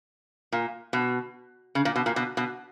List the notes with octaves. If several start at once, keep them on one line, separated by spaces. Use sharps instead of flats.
A#2
B2
C#3
A#2
B2
A#2
B2
B2